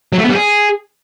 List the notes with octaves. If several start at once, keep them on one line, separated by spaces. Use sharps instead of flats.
F#3
A3
B3
G3
G#4